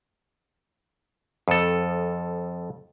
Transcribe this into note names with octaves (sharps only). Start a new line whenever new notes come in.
F2 A4